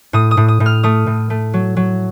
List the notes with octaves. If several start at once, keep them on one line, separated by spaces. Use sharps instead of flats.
A2 D#6
D#6
A2
D#6
A2
F6
A3 D#6
A2
A3
F#3
F#3